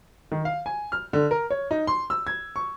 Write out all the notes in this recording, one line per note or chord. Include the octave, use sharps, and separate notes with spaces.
D#3
F5
G#5
F6
D3
A#4
C#5
D#4
C6
E6
G#6
C#6